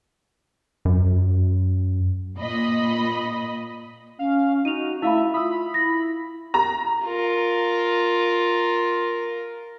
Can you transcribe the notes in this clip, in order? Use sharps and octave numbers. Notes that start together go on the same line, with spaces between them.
F#2
A#2 D#5 B5
C#4 F5
D#4 F#4 D#7 F7
A3 E4 E5 F5 B5
F4 B5 D#6 E6
E4 A#6
A#5
F4 A#4